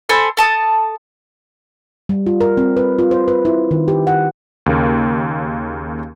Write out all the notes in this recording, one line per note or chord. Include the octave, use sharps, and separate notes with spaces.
A4 C5 G#5 B5
A4 A5 D#6
G3
F4
A#4
C4
B4
F4
C5
B4
E4
D#3
G4
F#5
D#2 C#3 A#3